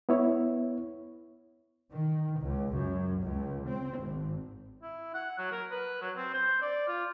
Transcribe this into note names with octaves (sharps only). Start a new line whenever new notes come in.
B3 E4 C#5
D#3
C#2
F#2
C#2
C4
G#1
E4
F#5
F#3
A#4
B4
F#3
C4
C5
D5
F4